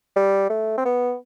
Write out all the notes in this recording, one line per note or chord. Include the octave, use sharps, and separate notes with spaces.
G3
A3
C4
B3